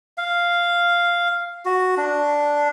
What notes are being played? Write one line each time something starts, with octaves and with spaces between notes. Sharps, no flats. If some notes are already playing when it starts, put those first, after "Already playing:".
F5
F#4
D4